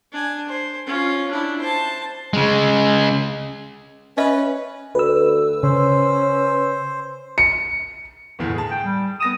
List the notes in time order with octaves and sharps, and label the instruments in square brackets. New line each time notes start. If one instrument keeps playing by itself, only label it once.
[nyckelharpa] D4 G#5
C5
C#4 F4
D4 E4
C5 A5
[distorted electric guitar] C#3 G#3
[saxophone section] C#4 B4 [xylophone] D#5 E5
[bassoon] D2 [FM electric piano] B4 E6
[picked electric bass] C#3 [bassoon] C#4 [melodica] C5
[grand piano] C#7
G1 E2 A2
G#4 A5
[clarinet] G5
G3
[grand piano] B3 A#6 E7 [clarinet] D#6